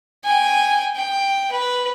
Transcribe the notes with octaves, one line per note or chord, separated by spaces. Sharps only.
G5 G#5
G5
B4